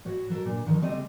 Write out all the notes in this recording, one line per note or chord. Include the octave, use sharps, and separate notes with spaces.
A2 F#4 C#5
F#3 A4 A#4
A#2 D4
D3 D#3 F3 D#4 C#5
C#3 G3 A3 C4 D#5